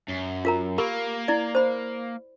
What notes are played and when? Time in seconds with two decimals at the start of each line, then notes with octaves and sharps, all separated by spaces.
0.08 F#2
0.45 F4 A#4 A#5
0.78 A#3 G4 A#4 B5
1.28 E4 D5
1.55 C5 B5